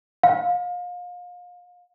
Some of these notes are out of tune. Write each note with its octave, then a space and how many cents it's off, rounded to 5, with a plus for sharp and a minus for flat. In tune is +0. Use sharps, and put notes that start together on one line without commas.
F5 +30